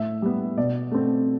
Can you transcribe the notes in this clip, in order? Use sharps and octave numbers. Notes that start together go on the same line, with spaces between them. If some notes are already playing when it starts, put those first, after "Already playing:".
Already playing: A2 E5
G3 B3
B2 D5
A3 C4